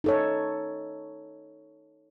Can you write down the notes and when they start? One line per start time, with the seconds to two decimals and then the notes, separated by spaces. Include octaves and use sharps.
0.04 D#4 A4 C#5